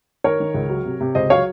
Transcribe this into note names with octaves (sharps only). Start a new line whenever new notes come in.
D#3 A#4 C#5
D#3
C#2
F#3
C3
C3
C#2 C5 D#5
F#3 C#5 F5